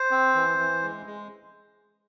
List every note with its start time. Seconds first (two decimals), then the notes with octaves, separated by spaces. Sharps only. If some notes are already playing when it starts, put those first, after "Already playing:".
Already playing: C5
0.11 C4
0.35 E3
0.58 E3
0.83 G#3
1.06 G#3